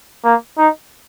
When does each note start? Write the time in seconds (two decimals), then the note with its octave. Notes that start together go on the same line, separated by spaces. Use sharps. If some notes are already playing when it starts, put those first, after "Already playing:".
0.25 A#3
0.58 D#4